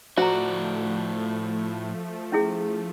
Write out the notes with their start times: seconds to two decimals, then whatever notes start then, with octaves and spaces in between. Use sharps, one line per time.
0.17 A2 F3 A3 F#4 C5 D5 A#5
2.32 C#4 E4 G#4